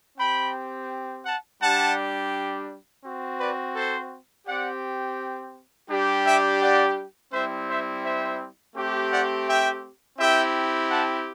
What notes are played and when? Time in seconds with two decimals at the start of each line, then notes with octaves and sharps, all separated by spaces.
0.18 C4 G4 G5 B5
1.25 F#5 A5
1.61 G3 D4 G4 F#5 A5
3.04 C4 F#4
3.40 B4 D5
3.76 A4 C5
4.47 C4 G4 D5 F#5
5.90 G3 D4 G4
6.26 E5 G5
6.62 D5 F#5
7.33 G3 C4 E4 C5 E5
7.68 C5 E5
8.04 C5 E5
8.76 A3 C4 G4
9.12 D5 F#5
9.48 E5 G5
10.19 C4 E4 G4 E5 G5
10.90 F#5 A5